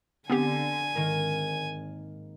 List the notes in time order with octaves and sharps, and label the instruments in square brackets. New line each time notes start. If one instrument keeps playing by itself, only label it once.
[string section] D3 [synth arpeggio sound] B3 C4 G4 [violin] G#5
[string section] G#1 [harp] D#3 A#3 A#4